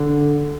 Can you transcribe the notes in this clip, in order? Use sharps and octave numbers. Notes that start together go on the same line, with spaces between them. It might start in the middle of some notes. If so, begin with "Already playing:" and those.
Already playing: D3